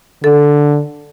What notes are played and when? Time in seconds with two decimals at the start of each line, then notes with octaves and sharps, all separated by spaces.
0.24 D3 A4